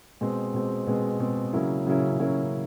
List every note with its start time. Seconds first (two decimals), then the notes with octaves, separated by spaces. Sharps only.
0.21 B2 G#3 C4
0.54 B2 G#3 C4
0.87 B2 G#3 C4
1.19 B2 G#3 C4
1.53 C#3 F#3 A#3 C#4 E4
1.86 C#3 F#3 A#3 C#4 E4
2.19 C#3 F#3 A#3 C#4 E4